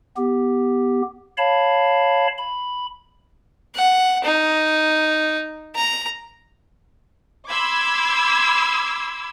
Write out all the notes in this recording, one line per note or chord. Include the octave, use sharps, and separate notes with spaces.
B3 G4
C#5 F5 A5 B5
B5
F#5
D#4
A#5
B5 C6 D6 E6 G#6